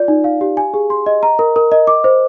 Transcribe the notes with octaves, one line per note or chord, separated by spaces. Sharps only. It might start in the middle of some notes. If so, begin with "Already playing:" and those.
Already playing: F4 D5
D#4
F5
G4
G#5
G#4
C6
D#5
A#5
A#4
A#4
D#5
D6
C5